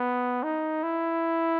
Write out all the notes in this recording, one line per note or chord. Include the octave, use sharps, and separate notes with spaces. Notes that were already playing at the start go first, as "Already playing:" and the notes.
Already playing: B3
D#4
E4